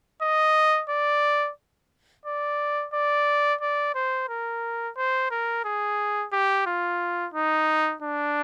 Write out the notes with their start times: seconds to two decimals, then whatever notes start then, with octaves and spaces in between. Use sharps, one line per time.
0.22 D#5
0.89 D5
2.26 D5
2.93 D5
3.61 D5
3.95 C5
4.29 A#4
4.97 C5
5.31 A#4
5.65 G#4
6.32 G4
6.66 F4
7.34 D#4
8.02 D4